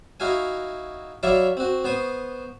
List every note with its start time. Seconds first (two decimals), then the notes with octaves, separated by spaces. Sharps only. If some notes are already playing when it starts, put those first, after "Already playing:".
0.20 D#4 E4 F#4 F5 G#5
1.23 F#3 E4 D5 E5 F5 C#6
1.57 C4 F#4
1.84 B3 C5 C#6 D#6